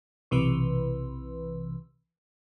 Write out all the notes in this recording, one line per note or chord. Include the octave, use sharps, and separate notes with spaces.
B1 C3 E3 B4